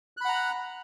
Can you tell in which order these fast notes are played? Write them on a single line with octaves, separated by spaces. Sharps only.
F#6 B5 F#5 A#5